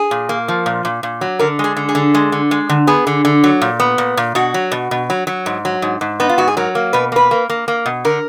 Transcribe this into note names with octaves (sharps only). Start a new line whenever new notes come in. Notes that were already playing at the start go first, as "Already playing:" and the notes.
Already playing: G#4
A#2
A#3
F3
A#2
A#2
A#2
F#3
D3 A#4
G#3
G#4
D3
G#4
D3
G#3
D3
G#3
D3
B3 G#4
D3
D3
F#3
A#2
B3
A#2
A#2
B2 F#4
F#3
B2
B2
F#3
F#3
G#2
F#3
G#2
G#2
B3 D#4
F4
G#2 F#4
G#4
F#3 A#4
A#3
B2 B4
A#3 B4
A#3
A#3
A#3
B2
D3 A#4